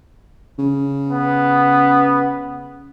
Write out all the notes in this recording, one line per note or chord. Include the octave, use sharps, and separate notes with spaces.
C#3
B3